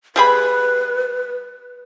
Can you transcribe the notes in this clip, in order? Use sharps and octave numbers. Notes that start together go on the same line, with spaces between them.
G3 G#4 B4 B5